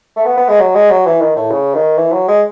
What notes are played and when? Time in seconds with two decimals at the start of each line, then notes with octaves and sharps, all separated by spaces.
0.16 A3
0.25 B3
0.37 B3
0.48 G#3
0.60 F#3
0.75 G#3
0.91 F#3
1.06 E3
1.21 D#3
1.36 A2
1.51 C#3
1.74 D#3
1.97 E3
2.12 F#3
2.28 G#3